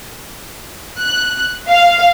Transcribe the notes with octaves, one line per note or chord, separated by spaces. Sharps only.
F#6
F5